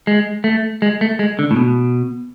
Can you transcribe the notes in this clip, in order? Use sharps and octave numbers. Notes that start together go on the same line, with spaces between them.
G#3
A3
G#3
A3
G#3
D3
A2
B2